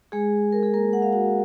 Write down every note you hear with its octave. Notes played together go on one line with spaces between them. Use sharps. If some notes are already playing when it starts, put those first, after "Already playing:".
G#3 G#4
A#4
G#4
A#3 A#4
F#5
F5
F#4 F#5